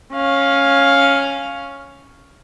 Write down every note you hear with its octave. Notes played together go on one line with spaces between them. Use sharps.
C#4 F5